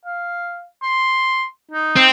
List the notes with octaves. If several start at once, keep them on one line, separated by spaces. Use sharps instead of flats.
F5
C6
D#4
C4